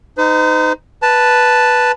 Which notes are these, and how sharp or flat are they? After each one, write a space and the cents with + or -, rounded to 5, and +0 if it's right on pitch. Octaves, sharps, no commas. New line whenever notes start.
D#4 -5 C5 -45
B4 -5 A5 +0